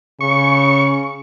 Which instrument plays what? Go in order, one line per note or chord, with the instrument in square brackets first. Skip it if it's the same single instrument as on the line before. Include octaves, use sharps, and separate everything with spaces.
[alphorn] C#3 [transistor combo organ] C#6